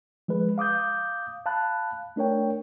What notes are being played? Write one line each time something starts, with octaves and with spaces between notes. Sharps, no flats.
F3 G#3 G#4 B4
F5 D6 D#6 G6
F5 A5 B5 F#6
A3 D4 A#4 C#5 G5